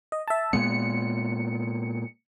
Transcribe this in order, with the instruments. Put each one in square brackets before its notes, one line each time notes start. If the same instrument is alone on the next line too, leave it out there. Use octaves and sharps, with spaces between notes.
[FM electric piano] D#5
E5 A5
[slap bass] A#2 G#3 B3 [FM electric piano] C#7